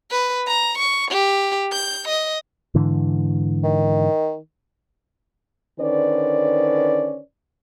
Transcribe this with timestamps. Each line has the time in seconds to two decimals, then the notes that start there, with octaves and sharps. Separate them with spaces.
0.11 B4
0.47 A#5
0.78 C#6
1.11 G4
1.72 G6
2.08 D#5
2.75 G#2 D3 E3
3.64 D#3
5.80 D3 D#3 C#4 B4 C5 D5